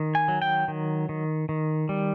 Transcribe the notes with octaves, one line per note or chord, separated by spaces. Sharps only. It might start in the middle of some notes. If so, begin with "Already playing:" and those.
Already playing: D#3
G#5
F#3
G5
D#3
D#3
D#3
G3